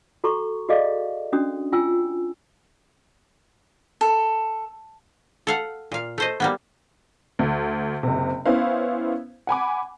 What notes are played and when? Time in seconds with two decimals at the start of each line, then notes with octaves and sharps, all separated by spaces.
0.24 F#4 A4 A#5 C6 C#6
0.69 F#4 G#4 A4 D5 D#5 F5
1.33 C#4 D4 F#4 D#6
1.72 F4 G5 G#5 E6
4.01 A4
5.47 A4 F5 F#5
5.92 A#2 F5
6.18 A3 C5 D#5
6.40 G3 A#3 B3
7.39 D2
8.03 F#1 C3
8.46 B3 C#4 E4 C5 F5
9.47 F#5 G#5 B5 D6